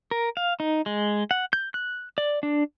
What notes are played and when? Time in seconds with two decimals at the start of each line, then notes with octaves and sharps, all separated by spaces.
0.11 A#4
0.37 F5
0.60 D#4
0.86 G#3
1.31 F#5
1.53 G6
1.74 F#6
2.18 D5
2.43 D4